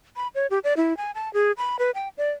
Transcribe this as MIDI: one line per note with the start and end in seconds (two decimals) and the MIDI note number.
0.16 0.28 83
0.35 0.47 73
0.50 0.59 67
0.64 0.74 74
0.77 0.96 64
0.97 1.11 80
1.15 1.32 81
1.34 1.52 68
1.57 1.77 83
1.79 1.91 71
1.95 2.08 79
2.18 2.30 74